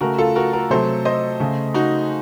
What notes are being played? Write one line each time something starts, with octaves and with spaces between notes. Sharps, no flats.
C#3 A3 F#4 A#4
F4 A4
F#4 A#4
F#4 A#4
C3 F#3 A3 A4 C5
C5 D#5
C#3 A3
D#4 F#4